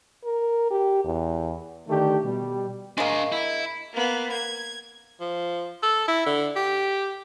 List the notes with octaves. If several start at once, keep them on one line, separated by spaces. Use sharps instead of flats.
A#4
G4
E2
D3 D#3 A3 D4 G4
B2 G3
G#3 A#3 D4 F5
E4
A#3 B3
G#6
F3
A4
E4
D3
G4